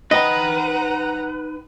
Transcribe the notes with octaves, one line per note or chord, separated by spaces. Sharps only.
D#4 B4 D#5 F#5 G5 A#5